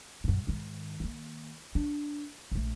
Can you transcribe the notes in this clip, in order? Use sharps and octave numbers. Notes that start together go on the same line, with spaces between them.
F#2 A#2
G#2 D#3
D#3 A#3
D4
A#1 A3